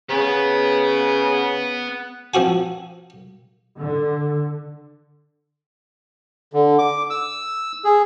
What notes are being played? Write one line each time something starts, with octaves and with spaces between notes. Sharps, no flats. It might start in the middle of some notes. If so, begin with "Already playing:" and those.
C#3 B3
F3 C4 F#4 G#5
D3
D3
D6
E6
G#4